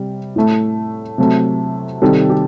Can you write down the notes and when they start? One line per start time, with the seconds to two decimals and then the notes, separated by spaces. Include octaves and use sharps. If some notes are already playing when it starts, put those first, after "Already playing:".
Already playing: C3 G3
0.36 A2 A3
1.18 C3 F#3 A3
2.02 C3 D#3 G3 A4
2.29 G4